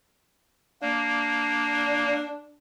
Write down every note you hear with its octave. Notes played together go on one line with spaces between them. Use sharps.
A#3 D4